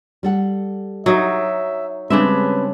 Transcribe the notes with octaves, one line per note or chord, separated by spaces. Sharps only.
G3 A4 F#5
F#3 D#4 E5
C#3 G3 G#3 C4 D4 B4 E5